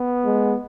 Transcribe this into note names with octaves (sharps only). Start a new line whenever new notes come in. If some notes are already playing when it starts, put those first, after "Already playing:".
Already playing: B3
G#3